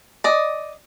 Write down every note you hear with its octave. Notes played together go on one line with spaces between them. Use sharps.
D5 D#5